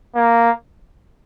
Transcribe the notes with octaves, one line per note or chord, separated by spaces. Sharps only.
A#3